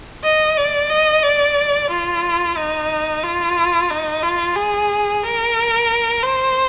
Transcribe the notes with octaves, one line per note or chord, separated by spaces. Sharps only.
D#5
D5
D#5
D5
F4
D#4
F4
D#4
F4
G#4
A#4
C5